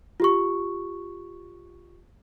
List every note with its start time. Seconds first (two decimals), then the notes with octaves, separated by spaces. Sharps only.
0.20 F4 G4 C#6